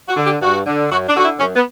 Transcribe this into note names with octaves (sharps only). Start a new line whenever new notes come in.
F#4
D3
G4
G2 F#4
D3
F#2 F#4
D4
D3 F#4
E4
F#2 C#4
B3